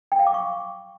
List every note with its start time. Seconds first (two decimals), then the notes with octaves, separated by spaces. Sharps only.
0.12 G5
0.19 F5
0.27 D6
0.34 C#6